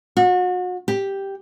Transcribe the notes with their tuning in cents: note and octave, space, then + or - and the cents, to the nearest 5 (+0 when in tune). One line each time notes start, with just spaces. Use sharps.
F#4 -35
G4 +0